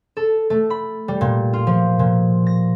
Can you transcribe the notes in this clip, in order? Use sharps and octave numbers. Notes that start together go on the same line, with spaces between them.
A4
A3
B5
G3
A#2
F4
F3
A#2
A#6